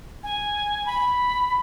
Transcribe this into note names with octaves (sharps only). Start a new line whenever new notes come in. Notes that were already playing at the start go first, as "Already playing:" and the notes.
G#5
B5